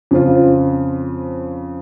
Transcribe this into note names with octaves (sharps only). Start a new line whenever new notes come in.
F2 C#3 F3 C4 F4